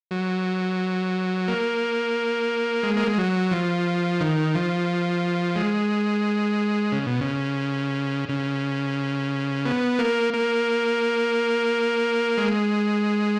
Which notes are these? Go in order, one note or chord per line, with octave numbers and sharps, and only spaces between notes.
F#3
A#3
G#3
A#3
G#3
F#3
F3
D#3
F3
G#3
C#3
B2
C#3
C#3
B3
A#3
A#3
G#3